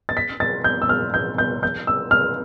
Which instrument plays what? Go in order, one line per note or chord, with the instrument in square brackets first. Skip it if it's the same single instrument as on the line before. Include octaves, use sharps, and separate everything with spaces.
[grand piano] A6
B6
A6
G6
E6
F6
G6
G6
G6
E6
F6